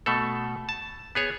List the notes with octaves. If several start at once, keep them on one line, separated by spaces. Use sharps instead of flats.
B2 A3 A4
A5
B3 G#4 C#5